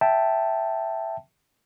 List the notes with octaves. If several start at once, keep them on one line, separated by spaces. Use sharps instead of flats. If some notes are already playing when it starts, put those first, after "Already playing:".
E5 G5 A5